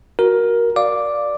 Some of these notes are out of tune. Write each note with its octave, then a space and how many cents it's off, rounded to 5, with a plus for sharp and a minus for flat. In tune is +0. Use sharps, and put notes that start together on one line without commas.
F#4 +0 A#4 +10
D5 +0 F5 +0 D6 +0